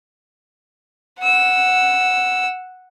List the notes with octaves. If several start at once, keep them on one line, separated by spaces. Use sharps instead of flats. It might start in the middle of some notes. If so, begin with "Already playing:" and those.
F#5 E6